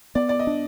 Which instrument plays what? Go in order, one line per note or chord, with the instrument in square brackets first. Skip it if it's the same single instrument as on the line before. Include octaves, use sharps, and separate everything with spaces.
[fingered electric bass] B3 [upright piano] D5
[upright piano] D5
D#5
[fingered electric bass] D4